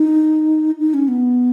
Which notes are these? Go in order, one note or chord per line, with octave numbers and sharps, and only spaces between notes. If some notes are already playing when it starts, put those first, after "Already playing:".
Already playing: D#4
D#4
C#4
B3